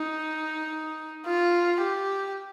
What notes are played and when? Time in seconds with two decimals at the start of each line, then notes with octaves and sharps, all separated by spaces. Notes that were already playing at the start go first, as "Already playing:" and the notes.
Already playing: D#4
1.26 F4
1.81 G4